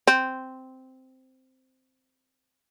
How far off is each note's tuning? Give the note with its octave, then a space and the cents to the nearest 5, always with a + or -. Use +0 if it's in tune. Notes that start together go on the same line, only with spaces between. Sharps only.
C4 -5